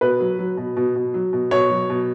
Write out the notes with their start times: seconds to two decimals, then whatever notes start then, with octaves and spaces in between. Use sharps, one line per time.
0.01 B2 B4
0.20 F#3
0.39 F#3
0.57 B2
0.77 B2
0.95 B2
1.14 F#3
1.33 B2
1.51 B2 C#5
1.70 F#3
1.90 B2